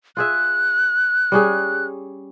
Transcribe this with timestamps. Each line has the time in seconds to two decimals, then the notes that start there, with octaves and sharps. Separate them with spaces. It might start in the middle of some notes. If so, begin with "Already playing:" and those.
0.17 F4 G#4 E5 F#6
1.32 G3 C#4 G#4